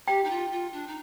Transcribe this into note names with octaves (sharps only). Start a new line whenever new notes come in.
G4 G5
D#4
F4
F4
D4
D#4